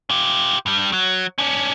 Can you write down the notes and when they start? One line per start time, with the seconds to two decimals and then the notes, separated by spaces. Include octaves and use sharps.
0.10 F4 G4
0.66 G2 G3
0.93 F#3
1.38 C#4 D4